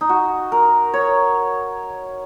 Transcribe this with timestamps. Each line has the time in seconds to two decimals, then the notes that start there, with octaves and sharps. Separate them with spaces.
0.01 D#4
0.09 F#4
0.52 A#4
0.93 C#5